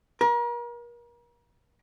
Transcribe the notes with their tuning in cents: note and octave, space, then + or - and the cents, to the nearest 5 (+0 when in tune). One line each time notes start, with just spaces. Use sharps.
A#4 +40